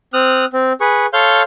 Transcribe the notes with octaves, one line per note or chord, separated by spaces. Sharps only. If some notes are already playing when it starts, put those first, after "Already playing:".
C4 D#6 F6 F#6
C4
G#4 B4 C#6
A4 C#5 F5 C6 F6 G6